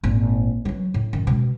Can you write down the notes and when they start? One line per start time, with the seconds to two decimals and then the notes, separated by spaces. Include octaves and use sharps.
0.03 G#1 A#2
0.65 E3 F#3
0.94 A2
1.13 F#2 D#3
1.27 B2 G#3